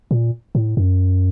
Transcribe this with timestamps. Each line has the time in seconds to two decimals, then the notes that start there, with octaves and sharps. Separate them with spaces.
0.11 A#2
0.55 A2
0.77 F#2